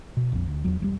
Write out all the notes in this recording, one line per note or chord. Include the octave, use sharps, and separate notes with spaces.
B2
A#1 F2
D2
E2 F#3
E1 F#3 G3